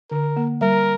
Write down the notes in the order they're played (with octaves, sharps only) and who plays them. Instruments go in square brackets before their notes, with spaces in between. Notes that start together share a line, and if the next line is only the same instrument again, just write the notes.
[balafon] D3 [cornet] A#4
[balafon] A#3
[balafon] G3 [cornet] A#4